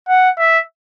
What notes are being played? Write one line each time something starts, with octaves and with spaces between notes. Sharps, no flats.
F#5
E5